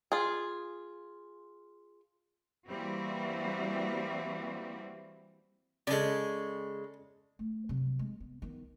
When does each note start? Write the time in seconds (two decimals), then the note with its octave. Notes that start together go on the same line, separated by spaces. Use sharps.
0.12 F4 G#4
2.67 E3 G3 A#3 C4 F#4
5.87 C#3 G#3 A4 D5
7.39 A3
7.69 C3 F#3
7.99 G#3
8.20 B3
8.42 D#3 B3